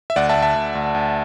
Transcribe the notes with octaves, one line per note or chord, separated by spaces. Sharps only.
E5
D2 D5 F#5
E5 A5
D2
E5 A5
D2
D2
D2